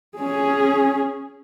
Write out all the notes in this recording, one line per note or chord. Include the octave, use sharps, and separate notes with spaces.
C#4 G#4